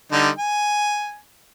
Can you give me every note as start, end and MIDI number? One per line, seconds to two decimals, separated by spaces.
0.12 0.29 50
0.12 0.29 55
0.12 0.29 63
0.38 1.17 80